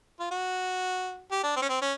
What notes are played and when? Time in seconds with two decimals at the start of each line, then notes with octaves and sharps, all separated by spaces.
0.20 F4
0.31 F#4
1.32 G4
1.44 D4
1.56 C4
1.62 C#4
1.69 C4
1.82 C#4